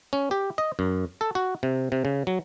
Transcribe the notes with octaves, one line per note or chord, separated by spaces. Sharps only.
C#4
G4
D#5
F#2
A4
F#4
C3
C3
C#3
F#3